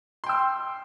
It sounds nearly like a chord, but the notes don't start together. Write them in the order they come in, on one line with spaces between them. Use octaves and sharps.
C6 G5 E6